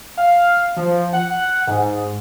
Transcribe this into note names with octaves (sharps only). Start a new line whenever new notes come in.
F5
F3
F#5
G#2